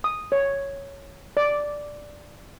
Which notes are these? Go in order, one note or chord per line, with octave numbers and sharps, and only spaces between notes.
D#6
C#5
D5